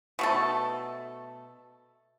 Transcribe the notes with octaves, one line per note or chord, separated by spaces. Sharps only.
B2 A3 A4